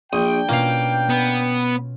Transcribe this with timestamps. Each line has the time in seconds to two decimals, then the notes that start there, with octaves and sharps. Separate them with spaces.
0.13 A#1 D4 G5 D#6
0.49 B2 A#3 C#4 F4 F5
1.10 B3